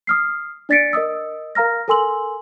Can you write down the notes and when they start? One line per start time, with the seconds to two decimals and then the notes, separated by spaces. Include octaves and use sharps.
0.07 D#6 F6 C7
0.69 D4 D5 A6 B6 C#7 D7
0.93 A#4 D#5 D#6 E6
1.55 A#4 F5 A#5 F6 A#6
1.88 A4 A#4 G#5 C6 E6 F#7